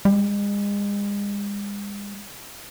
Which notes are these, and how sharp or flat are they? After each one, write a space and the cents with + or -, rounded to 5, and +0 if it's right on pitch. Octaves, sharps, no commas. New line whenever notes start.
G#3 -40